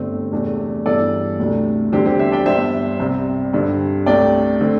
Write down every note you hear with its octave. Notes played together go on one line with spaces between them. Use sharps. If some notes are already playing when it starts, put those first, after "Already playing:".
Already playing: G1 G2 D3 A3 C4
E1 E2 C3 A3 D4
G1 G2 E3 A4 D5
D2 C3 A3 D4
E2 D3 G3 C4 G4 C5
G4 C5
C5 E5
D5 G5
G1 G2 G3 D4 C5 E5
C2 C3 G3 C4
G2 D3 C4
C2 C3 A3 D4 D5 G5
D3 A3 C4